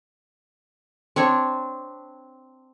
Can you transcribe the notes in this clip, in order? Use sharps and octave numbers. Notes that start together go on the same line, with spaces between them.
C4 D4 C#5